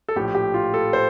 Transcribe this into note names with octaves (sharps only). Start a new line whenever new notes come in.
A4
A#1 A2 F3 G4
G4
F4
A4
C5